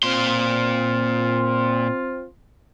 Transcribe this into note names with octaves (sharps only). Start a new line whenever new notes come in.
A#2 C4 F4 C6